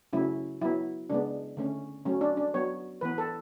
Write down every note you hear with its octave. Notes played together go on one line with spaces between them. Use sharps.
C#3 F#3 A3 C#4 E4
F#3 B3 E4
C#3 G#3 B3 D4
D3 A3 C#4
F#3 A3 C#4
D4
D4
F#3 B3 C#5
E3 B3 B4
A4